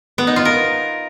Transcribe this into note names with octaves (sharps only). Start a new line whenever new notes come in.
B3
D#4
F4
A#4